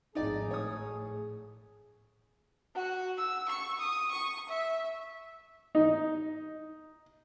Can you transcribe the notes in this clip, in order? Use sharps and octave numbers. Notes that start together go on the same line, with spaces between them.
G#1 F2 A2 D#4 G#4 D5
A2 C#5 D#6
F#4
E6
C#6
D#6
C#6
E5
D#4